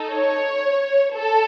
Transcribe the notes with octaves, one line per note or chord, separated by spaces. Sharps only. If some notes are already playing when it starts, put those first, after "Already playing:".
Already playing: D#4 A4
C#5
A4